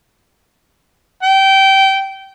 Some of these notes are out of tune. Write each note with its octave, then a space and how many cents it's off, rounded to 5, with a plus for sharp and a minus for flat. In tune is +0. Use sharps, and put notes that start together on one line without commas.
G5 -20